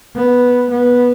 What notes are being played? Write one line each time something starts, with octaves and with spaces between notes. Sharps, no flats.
B3
B3